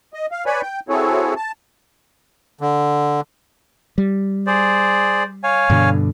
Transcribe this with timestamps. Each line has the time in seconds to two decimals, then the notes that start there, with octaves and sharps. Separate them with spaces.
0.14 D#5
0.32 F5
0.46 B4 C#5 D5 G#5 B5
0.62 G5
0.89 C4 E4 F#4 G#4 A4 C#5
1.36 A5
2.61 D3
3.98 G3
4.47 G#4 C5 D5
5.44 C#5 F5 G#5
5.70 G2 B2 D3